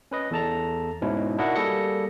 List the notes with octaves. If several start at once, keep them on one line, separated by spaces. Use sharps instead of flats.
C#4 B4 D#5
E2 A4 A5 A#5
G#2 B2 C#4 D#4 E4
D4 E4 F#4 A#4 D#5 F#5
G3 A#3 G#4 A4 A#6 C#7